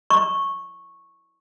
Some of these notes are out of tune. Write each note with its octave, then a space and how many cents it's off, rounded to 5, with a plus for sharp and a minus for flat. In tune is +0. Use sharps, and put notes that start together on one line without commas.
C#6 -10